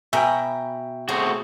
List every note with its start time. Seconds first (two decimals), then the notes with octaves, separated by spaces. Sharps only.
0.13 B2 E5 G5 G#5 A#5 B5
1.09 A3 C4 F#4 G#4